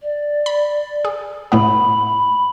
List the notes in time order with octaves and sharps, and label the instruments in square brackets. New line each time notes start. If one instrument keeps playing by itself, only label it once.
[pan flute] D5
[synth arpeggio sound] B5
G#4
[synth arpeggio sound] A2 A3 B3 [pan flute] B5